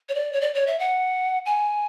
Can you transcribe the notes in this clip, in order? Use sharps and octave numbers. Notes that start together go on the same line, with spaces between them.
C#5
D5
C#5
D5
C#5
E5
F#5
G#5